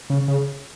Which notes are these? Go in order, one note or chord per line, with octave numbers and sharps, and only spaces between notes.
C#3
C#3